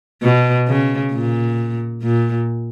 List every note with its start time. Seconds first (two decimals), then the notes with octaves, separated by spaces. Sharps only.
0.22 B2
0.67 C#3
1.12 A#2
2.03 A#2